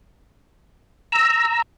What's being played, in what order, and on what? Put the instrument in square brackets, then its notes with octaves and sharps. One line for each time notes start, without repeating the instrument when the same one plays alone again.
[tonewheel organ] A#5 E6